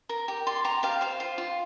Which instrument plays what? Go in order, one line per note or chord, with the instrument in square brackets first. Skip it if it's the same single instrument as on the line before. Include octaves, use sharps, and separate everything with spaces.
[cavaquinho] A#4
G4
D5 C6
G4 A#5
G4 F5
C5 F5
F4
F4